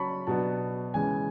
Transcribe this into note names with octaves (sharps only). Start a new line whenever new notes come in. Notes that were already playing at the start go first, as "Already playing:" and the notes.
Already playing: C#3 F#3 C#4 A5 B5 C#6
B2 F#3 B3 D4 A5
C#3 E3 G#3 G#5